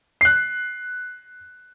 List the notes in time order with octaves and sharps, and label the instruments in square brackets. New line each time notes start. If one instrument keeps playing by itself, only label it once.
[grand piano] F#6 C7